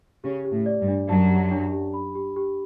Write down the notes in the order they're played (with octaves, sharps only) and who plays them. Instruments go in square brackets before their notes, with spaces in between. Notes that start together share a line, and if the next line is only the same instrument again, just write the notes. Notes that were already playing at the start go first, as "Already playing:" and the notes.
[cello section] C#3 C#4 [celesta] G4
[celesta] G4
[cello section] A2 A3
[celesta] D5
[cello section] G2 G3
[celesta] D4
[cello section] F#2 F#3 [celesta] A5
[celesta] G4
D4
G4
B5
G4
G4